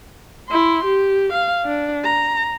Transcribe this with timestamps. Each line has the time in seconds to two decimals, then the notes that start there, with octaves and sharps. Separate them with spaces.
0.48 E4 C6
0.85 G4
1.33 F5
1.65 D4
2.04 A#5